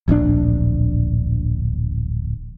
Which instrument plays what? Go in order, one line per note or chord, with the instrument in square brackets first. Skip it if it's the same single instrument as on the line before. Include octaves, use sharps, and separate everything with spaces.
[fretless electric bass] D1 A#1 C3 D4